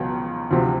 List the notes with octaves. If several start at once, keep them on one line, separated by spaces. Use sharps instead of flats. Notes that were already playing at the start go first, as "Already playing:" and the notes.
Already playing: C#2 B2 F#3
D2 C3 F3